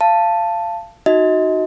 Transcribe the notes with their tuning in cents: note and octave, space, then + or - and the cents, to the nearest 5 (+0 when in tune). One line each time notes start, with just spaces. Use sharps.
F5 -25 A5 +5
D#4 +0 F#4 +0 D#5 +30